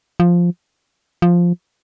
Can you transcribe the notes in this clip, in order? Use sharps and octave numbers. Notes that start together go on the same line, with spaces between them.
F3
F3